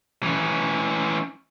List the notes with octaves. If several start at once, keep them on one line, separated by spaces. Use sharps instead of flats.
E3 C#4